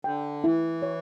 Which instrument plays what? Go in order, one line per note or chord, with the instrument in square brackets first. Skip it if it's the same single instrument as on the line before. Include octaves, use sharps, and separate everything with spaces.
[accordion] D3 [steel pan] G5
[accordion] E3 [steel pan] E4
[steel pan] C#5